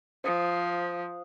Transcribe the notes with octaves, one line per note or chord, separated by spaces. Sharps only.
F3 C5 D#6